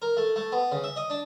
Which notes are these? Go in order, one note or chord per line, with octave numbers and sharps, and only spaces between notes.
A#4
A3
A3
B3
C#3
E5
D#5
D4